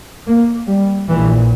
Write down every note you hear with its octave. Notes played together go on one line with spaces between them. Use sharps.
A#3
G3
A#1 A#2 E3